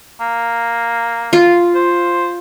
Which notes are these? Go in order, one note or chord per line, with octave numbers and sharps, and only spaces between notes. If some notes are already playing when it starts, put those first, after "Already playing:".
A#3
F4
C5